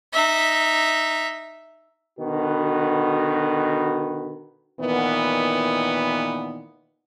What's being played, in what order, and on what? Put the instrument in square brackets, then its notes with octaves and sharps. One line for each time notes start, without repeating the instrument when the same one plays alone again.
[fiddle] D#4 E5
[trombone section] B2 D3 D#3 F#4 B4
[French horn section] A#2 D#3 E3 B3